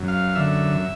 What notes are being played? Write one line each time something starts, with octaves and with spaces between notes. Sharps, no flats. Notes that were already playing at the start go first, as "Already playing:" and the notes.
Already playing: F#2
F5
D3 E5